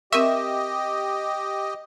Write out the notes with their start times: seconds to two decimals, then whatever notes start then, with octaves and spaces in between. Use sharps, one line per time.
0.13 C4 G4 A#4 D#5 E5 C#6